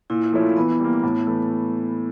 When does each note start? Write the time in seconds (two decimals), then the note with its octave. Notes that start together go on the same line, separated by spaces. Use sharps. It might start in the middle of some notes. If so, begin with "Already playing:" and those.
0.10 A#2 E4
0.32 F3 A3 C#4 E4
0.57 E3 B3
0.79 G3
0.84 A#3
1.04 A2
1.27 E3 A3